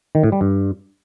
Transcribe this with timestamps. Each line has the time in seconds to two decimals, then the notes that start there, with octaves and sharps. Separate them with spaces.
0.15 D#3
0.24 A2
0.32 G3
0.41 G2